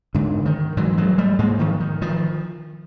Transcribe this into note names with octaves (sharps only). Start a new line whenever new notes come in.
G#2 D3
D#3
G#2 E3 F#3
F#3 G#3
G3 A3
G#2 G#3 A#3
D#3 F3
D#3
D#3 F3